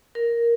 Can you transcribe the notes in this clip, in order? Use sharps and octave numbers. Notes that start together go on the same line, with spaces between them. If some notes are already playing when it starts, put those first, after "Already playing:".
A#4